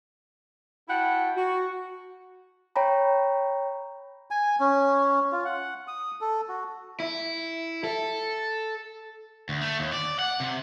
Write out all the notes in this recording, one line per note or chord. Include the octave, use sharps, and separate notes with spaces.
E4 F#4 F#5 G5 A5
F#4
C#5 G5 A#5 B5
G#5
C#4
F4
F#5
D#6
A4
F#4
E4
A4
D2
A3
D#2
D5
F#5
C3